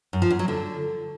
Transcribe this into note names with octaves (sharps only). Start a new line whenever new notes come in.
F#2
F3
F#2
F#3
D3